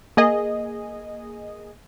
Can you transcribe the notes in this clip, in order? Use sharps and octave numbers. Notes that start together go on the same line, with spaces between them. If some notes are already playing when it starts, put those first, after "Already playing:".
A#3 G#4 D#5